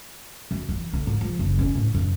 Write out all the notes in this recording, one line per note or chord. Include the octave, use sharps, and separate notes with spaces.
F#2
E3
D3
G#2
F3
F#1
C#4
A2
F#2